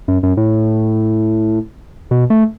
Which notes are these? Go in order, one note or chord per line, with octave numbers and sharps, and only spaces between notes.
F#2
F#2
A2
B2
A3